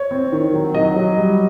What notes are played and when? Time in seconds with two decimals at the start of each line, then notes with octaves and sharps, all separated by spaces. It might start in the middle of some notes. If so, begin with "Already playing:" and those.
Already playing: C#5
0.11 C4
0.32 D#3
0.54 F#3
0.75 F#3 D#5
0.96 F#3
1.17 G3